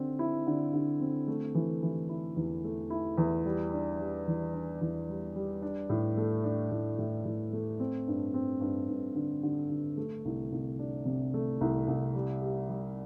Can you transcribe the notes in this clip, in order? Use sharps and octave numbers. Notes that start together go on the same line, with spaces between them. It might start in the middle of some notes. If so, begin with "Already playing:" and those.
Already playing: D3 C4
E4
D3
D3
C4
A3
E3
E3
E4
E2
A3
E4
E2
G3
D4
G3
E3
D4
E2
G3
G3
D4
A2
A3
D4
A2
A2
A2
A3
C4
G2
C4
G2
G2
D3
D3
D3
A3
C2
C2
D4
C3
A3
C2
C2
G3
G4
G3